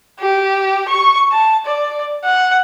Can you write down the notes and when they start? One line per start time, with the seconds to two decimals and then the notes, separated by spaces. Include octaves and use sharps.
0.20 G4
0.88 C#6
1.32 A5
1.66 D5
2.24 F#5